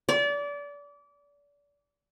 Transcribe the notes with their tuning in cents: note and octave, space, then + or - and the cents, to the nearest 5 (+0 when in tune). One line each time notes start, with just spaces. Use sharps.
D5 -30